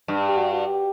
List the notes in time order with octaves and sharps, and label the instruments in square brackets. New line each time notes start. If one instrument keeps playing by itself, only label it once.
[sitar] G2
[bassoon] G4
F#4
F#4
G4